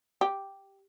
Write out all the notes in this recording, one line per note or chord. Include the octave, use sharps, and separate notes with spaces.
G4